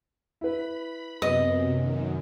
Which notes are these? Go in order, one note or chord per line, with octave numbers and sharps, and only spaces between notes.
E4 B4 B5
F#2 C3 B3 D#5
D#3